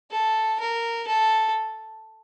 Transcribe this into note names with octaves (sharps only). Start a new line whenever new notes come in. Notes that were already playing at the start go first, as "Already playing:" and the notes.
A4
A#4
A4